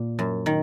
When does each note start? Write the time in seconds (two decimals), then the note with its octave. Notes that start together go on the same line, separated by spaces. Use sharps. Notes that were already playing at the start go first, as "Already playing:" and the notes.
Already playing: A#2
0.19 F#2
0.46 D#3